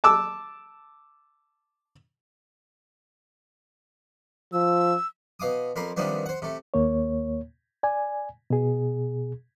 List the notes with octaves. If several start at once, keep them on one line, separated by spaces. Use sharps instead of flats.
A5 D6 E6
F3 E6
B2 F5 D6 D#6
F2 A#4 B5 C6 D6
C3 D#3 F3 G3 B3 D4
C5 F#5
C3 A3
D#2 A#3 C#5
D5 G#5
B2 G#4